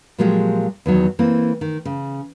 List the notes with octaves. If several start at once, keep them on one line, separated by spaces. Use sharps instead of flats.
A#2 F3 F#3 G#3 G4 G#4
E2 D#3 F#3
E3 A#3 C4
D#3
C#3